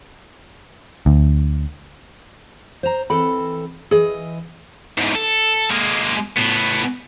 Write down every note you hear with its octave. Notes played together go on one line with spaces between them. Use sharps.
D2
C5 A#5
E3 C4 A4 B5
E3 G#4 D#5
E2 G#2
A4
G#3 A#3
A2 B3